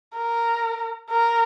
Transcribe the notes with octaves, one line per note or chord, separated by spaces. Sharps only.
A#4
A#4